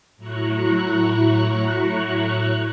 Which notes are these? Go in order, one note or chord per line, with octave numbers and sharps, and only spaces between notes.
A2 F#3 E4 A#5 C#6 F#6